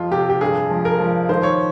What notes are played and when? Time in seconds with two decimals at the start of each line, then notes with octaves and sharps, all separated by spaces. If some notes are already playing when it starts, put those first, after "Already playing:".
Already playing: F2 F3 F4
0.12 C3 G4
0.30 G4
0.41 G2 G#4
0.71 F3
0.85 A#4
1.00 F3
1.29 D#3 C5
1.43 C#5